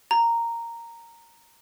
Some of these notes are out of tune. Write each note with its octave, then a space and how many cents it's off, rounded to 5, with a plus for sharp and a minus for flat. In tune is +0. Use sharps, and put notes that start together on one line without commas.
A#5 -10